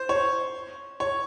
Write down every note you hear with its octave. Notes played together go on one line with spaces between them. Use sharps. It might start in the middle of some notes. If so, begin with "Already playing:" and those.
Already playing: C5
C#5
C#5